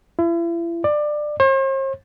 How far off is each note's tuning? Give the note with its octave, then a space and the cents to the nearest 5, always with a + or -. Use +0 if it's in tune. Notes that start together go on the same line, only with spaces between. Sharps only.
E4 +40
D5 +20
C5 +45